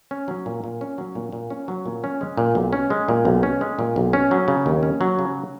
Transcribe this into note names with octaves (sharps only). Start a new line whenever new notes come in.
C#4
F#3
A#2
A#2
C#4
F#3
A#2
A#2
C#4
F#3
A#2
C#4
G#3
A#2
B1
C#4
G#3
A#2
B1
C#4
G#3
A#2
B1
C#4
F#3
C#3
D#2
C#4
F#3
C#3